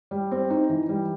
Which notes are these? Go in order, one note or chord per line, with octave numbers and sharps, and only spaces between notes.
G3
C4
D#4
E3
G3